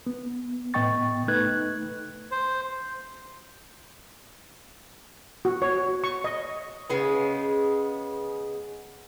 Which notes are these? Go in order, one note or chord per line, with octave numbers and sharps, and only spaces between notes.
B3
A2 B3 D#5 G5 C#6 A6
A3 D#4 B4 F#6 G#6
C5
F#4
C#5
C#6
D#5
C#3 G#3 B3